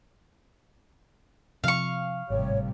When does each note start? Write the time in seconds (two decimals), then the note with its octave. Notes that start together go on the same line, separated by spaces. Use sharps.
1.64 C3 F3 F5 C#6
2.30 G#1 A2 C3 G3 C#5